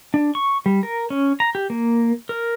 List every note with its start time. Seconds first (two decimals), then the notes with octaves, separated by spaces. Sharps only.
0.14 D4
0.35 C#6
0.66 G3
0.83 A#4
1.10 C#4
1.40 A#5
1.55 G4
1.70 A#3
2.29 A#4